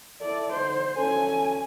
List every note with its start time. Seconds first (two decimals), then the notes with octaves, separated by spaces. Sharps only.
0.21 E4 A4 D5
0.53 D3 D#4 C5
0.98 D2 C#4 A4 G#5